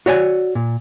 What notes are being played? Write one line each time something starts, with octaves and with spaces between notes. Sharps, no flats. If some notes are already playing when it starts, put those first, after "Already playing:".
F#4 C#5 D5 G#5
A#2